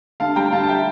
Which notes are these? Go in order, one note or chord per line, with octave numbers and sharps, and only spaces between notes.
D3 F5 A5
G3 G5 A#5
D3 F5 A5
A5
E5 G5